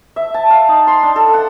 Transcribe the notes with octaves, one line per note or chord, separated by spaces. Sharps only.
E5
A5
F5
D#4
C6
D4
A4
F#5